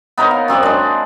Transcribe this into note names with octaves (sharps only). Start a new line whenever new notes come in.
B3 D#4 A#4 C#5
F5
F#2 C4 F#4 D5
G#3 D4